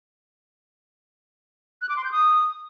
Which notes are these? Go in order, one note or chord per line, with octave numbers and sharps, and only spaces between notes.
F#6
D6
C6
G6
D#6